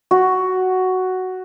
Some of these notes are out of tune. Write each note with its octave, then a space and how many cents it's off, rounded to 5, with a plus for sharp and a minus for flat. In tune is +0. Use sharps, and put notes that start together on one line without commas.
F#4 +5